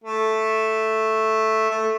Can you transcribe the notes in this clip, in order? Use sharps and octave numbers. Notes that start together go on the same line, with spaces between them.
A3
A3